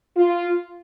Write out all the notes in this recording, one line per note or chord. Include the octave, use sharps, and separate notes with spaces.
F4